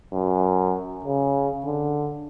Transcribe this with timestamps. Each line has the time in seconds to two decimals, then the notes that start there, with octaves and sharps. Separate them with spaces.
0.13 F#2
1.05 C#3
1.66 D3